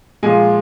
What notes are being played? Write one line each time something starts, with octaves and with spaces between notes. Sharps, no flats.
A#2 F3 G#3 G#5